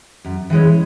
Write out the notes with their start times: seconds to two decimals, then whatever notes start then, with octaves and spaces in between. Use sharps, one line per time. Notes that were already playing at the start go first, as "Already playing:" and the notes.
0.25 F#2
0.50 E3 G#3 C#4